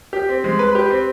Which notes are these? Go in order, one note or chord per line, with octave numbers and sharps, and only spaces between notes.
G4
C4
G#3
B4
G4
C4